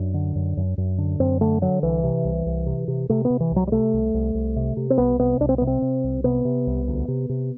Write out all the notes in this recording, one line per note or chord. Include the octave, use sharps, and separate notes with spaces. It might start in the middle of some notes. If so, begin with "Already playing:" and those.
Already playing: F#2 D4
D3
F#2
F#2
F#2
D3
F#2 C4
D3 A3
D3 F#3
C2 E3
C3
C2
C2
C3
C3
C3 A3
B3
C3
E3
C2
F#3
G3
C3 A3
C2
C2
C2
C3
C3
C4
C2 B3
C3 B3
C2 D4
C4
C3 B3
C4
C3
C2
C3 B3
C3
C2
D2
C3
C3